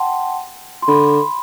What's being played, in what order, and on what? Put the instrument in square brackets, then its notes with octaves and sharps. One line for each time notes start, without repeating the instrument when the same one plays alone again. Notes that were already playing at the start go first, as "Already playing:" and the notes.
Already playing: [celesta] F#5 G5 A5 C6
C6
[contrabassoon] D3 [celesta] B5